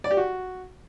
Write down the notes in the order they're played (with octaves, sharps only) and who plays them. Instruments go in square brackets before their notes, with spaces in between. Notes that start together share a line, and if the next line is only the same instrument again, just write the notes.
[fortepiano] D5
G4
F#4